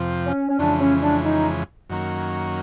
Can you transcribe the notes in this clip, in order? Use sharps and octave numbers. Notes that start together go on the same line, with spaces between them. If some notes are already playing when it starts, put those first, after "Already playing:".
Already playing: F2 C3 F3
C#4
C#4
F2 C#3 E3 G#3 D4
C#4
D4
D#4
F#2 D#3 F#3 A#3 C#4